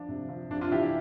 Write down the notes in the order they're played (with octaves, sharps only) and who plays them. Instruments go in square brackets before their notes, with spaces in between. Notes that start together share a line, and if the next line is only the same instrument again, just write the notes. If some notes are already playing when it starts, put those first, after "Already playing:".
Already playing: [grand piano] F3 D4
C3
F3
C3 D4
D4 F4
E3 E4 G4
E4